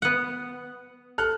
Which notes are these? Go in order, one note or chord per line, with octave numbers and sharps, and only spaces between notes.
B3 F#5
A4 F6 F#6